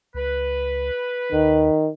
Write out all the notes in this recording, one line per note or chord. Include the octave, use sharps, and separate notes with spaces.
C#2 B4
D#2 D#3